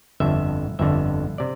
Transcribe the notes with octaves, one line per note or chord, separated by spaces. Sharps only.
G1 F2 D3 E5
G1 F2 D3 E5
C3 D5